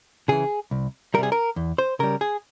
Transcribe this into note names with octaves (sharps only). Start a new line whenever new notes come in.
C#3 E3 G#4
C2
C3 G3 G#4 A#4
A#4
E2
C5
C#3 G3 A#4
G#4